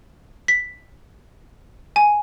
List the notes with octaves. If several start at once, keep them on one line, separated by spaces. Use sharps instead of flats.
B6
G#5